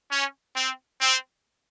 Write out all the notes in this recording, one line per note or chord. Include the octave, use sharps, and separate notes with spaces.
C#4
C4
C4